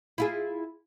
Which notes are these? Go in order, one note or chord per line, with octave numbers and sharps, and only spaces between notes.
E4 F4 G#4